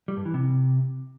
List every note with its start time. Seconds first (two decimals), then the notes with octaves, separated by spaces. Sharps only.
0.08 G3
0.17 G2
0.25 E3
0.34 C3